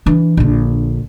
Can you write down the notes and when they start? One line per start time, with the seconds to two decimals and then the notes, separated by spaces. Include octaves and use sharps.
0.06 E3 D4
0.37 A#1 D3